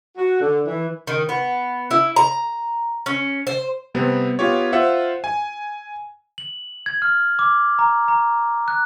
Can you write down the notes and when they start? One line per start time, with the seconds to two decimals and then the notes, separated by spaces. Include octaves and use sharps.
0.17 F#4
0.39 D3
0.66 E3
1.07 D#3
1.29 B3
1.91 E4
2.16 A#5
3.06 C#4
3.47 C5
3.95 C3 G3 B3 C4
4.39 B3 F4 G4 C#5
4.72 F4 C5 E5 F#5
5.24 G#5
6.38 F#7
6.86 G#6
7.02 F6
7.39 D6
7.79 A#5
8.08 A#5
8.68 F#6